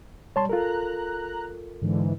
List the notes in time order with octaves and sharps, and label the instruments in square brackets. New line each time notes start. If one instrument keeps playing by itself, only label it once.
[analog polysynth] G3 [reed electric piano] C#5 A5 C6
[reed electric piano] F4 A4 A#4 [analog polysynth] A#5 F#6
[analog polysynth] G#2 D3 E3